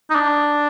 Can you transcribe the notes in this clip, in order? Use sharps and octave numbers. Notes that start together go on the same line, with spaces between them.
D#4
D4